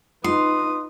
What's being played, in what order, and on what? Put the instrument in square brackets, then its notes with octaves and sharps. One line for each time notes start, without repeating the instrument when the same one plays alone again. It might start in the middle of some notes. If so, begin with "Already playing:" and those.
[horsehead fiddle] D#4 B4 [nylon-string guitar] F4 [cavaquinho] C6 [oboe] D#6